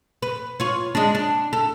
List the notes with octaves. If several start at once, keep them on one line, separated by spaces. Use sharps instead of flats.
B4
F4 C#5
G#3 D4
D4
A4